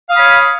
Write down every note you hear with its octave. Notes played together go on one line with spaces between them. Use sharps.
C#5 F5 B5 D#6